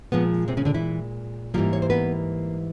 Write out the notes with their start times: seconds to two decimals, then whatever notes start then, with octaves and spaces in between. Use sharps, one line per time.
0.12 A#2 F3 G#3 B3
0.48 C3 C4
0.57 C#3 C#4
0.65 D3 D4
0.74 E3 E4
1.54 G#2 E3 F3 G3 A#3 F4
1.73 C#5
1.82 C5
1.90 B3 B4